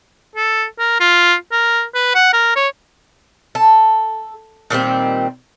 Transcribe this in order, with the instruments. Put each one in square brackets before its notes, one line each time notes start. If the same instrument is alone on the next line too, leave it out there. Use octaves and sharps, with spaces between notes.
[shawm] A4
A#4
F4
A#4
B4
F#5
A#4
C#5
[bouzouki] A4
A#2 D#3 G3 C4